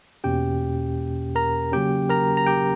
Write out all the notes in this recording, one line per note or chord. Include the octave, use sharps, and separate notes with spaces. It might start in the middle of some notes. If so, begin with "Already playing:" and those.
E2 B2 A#3 C#4 G4 G5
A#4 A#5
C#3 F#3 A#3 C#4 G4 G5
A#4 A#5
A#5
G4 G5